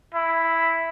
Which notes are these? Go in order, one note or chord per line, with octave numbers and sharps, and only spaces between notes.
E4